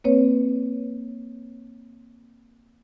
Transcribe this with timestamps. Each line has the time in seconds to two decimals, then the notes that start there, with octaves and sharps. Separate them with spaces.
0.04 A#3 C4 B4 C#5